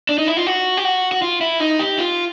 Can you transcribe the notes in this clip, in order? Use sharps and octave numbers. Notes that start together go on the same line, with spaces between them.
D4
D#4
E4
F4
F#4
G4
F#4
F#4
F4
E4
D#4
G4
F4